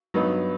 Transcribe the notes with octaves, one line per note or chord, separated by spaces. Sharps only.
G2 F#3 B3 D#4